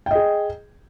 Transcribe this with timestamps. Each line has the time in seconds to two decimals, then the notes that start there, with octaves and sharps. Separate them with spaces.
0.06 G5
0.11 D#5
0.15 G#4